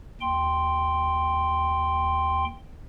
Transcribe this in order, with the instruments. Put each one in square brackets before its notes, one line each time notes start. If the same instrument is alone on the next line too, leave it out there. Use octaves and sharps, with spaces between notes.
[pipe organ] D#2 G5 C6